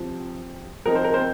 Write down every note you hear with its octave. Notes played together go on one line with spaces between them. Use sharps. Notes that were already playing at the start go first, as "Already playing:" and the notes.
Already playing: C3 F3 C4
F3 C4 D#4 A#4
C5
A#4
C4 C5